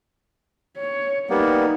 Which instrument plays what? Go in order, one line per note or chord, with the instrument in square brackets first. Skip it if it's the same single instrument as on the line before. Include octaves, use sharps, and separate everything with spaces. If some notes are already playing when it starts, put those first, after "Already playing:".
[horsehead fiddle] C#5
[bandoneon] G3 A#3 B3 [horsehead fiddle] D#4